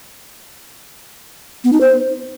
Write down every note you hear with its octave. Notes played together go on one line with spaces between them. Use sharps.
B3
D#4
C5